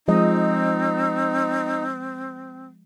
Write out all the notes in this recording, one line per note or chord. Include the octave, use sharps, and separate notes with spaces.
F3 G#3 C4 D#4 D#5